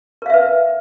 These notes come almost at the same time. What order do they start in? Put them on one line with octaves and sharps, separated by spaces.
A#4 F5 E5 B4